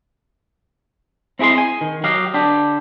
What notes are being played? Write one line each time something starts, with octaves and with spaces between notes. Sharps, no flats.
C4 E4 G#4 D#5 C6
G#5
D#3
F#3 F#4 G4 D#5 F5
D3 D4 G4